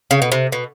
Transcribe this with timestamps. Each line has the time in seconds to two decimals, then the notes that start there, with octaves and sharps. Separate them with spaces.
0.11 C#3
0.22 B2
0.32 C3
0.52 B2